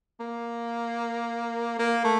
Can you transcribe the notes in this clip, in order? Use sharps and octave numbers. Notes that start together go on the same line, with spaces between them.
A#3
A#3
A3